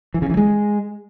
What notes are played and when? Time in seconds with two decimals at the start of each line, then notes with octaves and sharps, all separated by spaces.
0.14 E3
0.22 C#3
0.30 E3
0.37 G#3